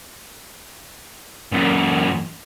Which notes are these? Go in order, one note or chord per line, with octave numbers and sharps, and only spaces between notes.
F#2 A#2